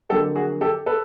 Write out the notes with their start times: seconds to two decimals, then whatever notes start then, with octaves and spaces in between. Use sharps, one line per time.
0.09 F2 D3 F#3 A#3 G4 A4
0.35 F#4 G#4
0.61 G4 A4
0.86 A4 B4